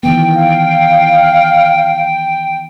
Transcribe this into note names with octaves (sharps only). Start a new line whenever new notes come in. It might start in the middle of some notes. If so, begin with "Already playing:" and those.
D#3 E3 B3 G5
F5